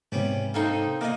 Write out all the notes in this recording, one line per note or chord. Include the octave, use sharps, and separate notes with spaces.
G#2 C3 G3 B3 C#4
A#3 C4 D#4 A4
A#2 A#3 D#4 D#5